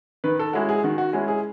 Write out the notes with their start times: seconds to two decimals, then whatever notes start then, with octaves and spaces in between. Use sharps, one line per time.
0.24 D#3 B4
0.39 A4
0.53 G#3 C#4 E4 F#4
0.69 G#4
0.84 D#3 F#4
0.98 F#4
1.13 G#3 C#4 E4 G#4
1.28 G#4